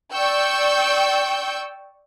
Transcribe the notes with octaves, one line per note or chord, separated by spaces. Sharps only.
D5 G5 C#6 E6 G6